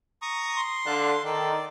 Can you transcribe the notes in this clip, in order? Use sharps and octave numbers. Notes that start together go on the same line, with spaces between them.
A#5 C#6 D#6
C6
D3 F5 A5 F#6
D#3 A4 D5